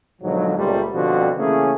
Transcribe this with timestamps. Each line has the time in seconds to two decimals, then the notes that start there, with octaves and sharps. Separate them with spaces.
0.22 G#2 B2 D3 F3 F#3
0.57 C#2 A#2 G3 A3 C5
0.93 B2 D3 F3 G3 C4 F#4
1.37 C#3 E3 A3 A#3 C#4 G#4